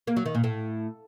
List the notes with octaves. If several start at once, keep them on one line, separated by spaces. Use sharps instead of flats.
A#3
F#3
D#3
A#2
A2